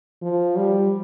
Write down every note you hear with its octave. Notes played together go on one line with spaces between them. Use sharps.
F3
G3